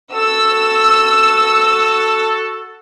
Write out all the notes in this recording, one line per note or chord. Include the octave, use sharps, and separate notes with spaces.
F#4 A4 E6